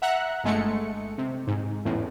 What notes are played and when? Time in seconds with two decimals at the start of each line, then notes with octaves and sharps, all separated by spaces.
0.02 E5 F#5 A#5 F#6
0.44 G1 G#3 A3 C#7
1.18 C3
1.47 G#2
1.85 A1 E2 A2